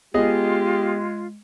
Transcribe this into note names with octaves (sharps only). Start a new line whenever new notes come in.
G#3 B3 F4 G4 G#4 D#5